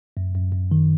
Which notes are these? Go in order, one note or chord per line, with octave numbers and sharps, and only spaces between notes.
F#2
F#2
F#2
D#3